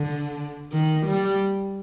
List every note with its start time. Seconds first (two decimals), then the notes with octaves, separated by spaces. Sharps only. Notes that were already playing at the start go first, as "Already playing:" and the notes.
Already playing: D3
0.72 D#3
1.06 G3